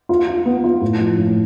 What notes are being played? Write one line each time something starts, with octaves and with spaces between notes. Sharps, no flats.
F4
F4
B3
F4
A2
F3
A2